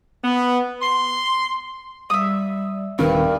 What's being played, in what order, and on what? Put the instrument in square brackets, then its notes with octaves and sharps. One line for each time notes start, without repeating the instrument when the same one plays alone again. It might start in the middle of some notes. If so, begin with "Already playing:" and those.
[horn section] B3
C6
[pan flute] G3 [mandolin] E5 D#6
[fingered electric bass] D#1 D#3 C4 [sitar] G2 [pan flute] A#4